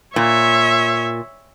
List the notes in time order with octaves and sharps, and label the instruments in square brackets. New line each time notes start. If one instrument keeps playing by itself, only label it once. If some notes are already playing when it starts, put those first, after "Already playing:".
[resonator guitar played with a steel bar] A#2 [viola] C#5 E5